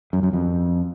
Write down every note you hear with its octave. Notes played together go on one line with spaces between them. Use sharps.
F#2
F#2
F2